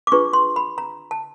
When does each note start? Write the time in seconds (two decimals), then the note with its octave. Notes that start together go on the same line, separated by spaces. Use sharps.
0.07 D6
0.12 D4 F4 G#4 B4 C#6
0.33 C6
0.56 B5
0.78 A#5
1.11 A5